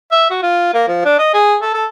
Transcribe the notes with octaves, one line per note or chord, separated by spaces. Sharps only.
E5
F#4
F4
A#3
F3
D4
D#5
G#4
A4
A4